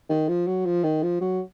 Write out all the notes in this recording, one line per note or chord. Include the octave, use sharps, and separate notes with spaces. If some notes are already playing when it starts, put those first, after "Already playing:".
D#3
F3
F#3
F3
D#3
F3
F#3